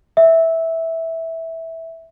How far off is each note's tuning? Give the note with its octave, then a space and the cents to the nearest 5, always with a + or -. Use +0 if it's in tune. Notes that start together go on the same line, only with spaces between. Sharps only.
E5 -10